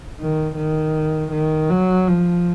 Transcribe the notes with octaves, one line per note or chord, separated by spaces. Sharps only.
D#3
D#3
D#3
F#3
F3